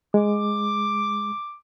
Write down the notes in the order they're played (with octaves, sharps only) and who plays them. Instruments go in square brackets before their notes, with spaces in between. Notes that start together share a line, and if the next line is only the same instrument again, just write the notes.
[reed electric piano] G#3 [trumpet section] D6